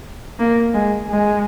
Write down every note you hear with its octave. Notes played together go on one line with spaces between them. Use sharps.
A#3
G#3
G#3